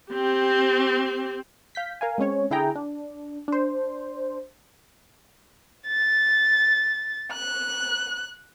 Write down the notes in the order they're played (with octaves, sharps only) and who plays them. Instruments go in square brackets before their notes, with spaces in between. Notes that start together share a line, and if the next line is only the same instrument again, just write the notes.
[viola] C4 G4
[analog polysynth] F5 G6 B6
A#4 F5 G#5
G#3 C4 C#4 C#5
D3 E4 G#4 G5 A#5
D4
D4 C5
[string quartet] A6
F#6